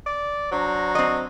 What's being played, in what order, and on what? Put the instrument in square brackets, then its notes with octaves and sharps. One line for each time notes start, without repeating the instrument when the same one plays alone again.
[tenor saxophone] D5
[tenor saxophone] F#3 [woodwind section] D4 C5 A#5
[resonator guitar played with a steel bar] C4 D#5